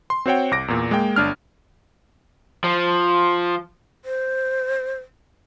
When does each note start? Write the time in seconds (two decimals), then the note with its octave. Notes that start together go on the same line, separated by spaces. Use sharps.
0.10 C6
0.26 C4 F#4 C5 C#5 F#5 G5
0.51 C2 D6 A#6 D7
0.68 E2 A#2
0.91 G#3 A#3 G5
1.16 G1 D4 F6
2.64 F3
4.05 C5